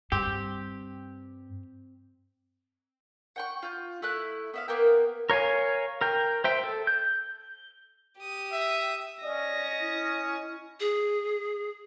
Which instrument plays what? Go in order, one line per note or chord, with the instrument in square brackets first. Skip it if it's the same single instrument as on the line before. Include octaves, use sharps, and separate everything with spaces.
[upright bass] G2 [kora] C4 [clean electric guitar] G4
[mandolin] F#5 G5 C#6
F4 G6
A3 E4 F#6
B3 E5 F5
A#3 B3 A#4 G5
[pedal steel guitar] A#4 C#5 F5 G#5
A#4 G5
C5 E5 G5
A4
G6
[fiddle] G4 D#6
[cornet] E5
[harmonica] C#4 [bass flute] D5 [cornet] D#5 [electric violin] A#6
[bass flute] E4
[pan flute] G#4